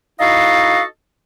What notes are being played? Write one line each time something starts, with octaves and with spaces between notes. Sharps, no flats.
D#4 E4 F#4 A4 D#5 F5